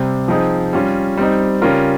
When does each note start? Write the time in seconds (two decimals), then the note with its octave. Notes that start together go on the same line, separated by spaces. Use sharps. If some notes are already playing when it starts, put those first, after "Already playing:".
Already playing: C3 G3 C4
0.28 F3 C4 D#4 G#4
0.73 G3 C#4 F4
1.17 G3 C4 D#4
1.62 C#3 G3 C#4 F4 A#4